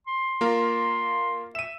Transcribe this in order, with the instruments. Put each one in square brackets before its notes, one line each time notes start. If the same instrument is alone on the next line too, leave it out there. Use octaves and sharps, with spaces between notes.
[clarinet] C6
[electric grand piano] A#3 F4 A#4
[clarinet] E5 [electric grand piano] D#7 E7